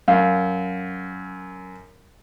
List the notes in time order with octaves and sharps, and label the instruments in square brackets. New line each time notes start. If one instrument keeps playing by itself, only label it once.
[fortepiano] F#2 [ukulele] F5